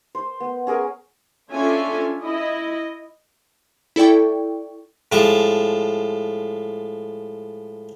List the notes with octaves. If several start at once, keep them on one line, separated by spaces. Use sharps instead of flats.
C5
B3
C#4 G#4 A#4 G#5
C#4 D4 F4 A4 E5 G#5
E4 D#5
E4 A4 D5 G5 C#6
A2 F3 G#3 A5 D6